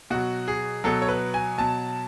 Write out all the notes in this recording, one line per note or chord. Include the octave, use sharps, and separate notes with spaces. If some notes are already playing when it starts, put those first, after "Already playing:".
B2 F#3 F#4
G#4
B2 F#3 A4
C#5
B4
G#5
B2 F#3 A5